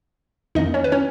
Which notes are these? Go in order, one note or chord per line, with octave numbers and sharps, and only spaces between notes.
F2 D#3 A#3 C#4 D#4 D#5
C#4 C#5
B4
C#4 C#5